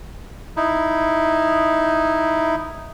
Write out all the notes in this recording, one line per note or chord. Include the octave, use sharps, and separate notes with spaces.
D#4 E4